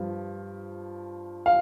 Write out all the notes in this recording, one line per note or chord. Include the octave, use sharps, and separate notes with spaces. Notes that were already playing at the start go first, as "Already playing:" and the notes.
Already playing: G2 F3
F5